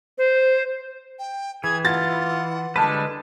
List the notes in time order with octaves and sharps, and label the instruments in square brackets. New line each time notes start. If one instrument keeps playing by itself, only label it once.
[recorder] C5
[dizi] G5
[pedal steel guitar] E3 [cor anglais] G#4 [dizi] G#6
[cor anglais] F4 [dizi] F#5 [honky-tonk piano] A6
[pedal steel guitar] D3 G#3 B4 [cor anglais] G3 [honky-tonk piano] A5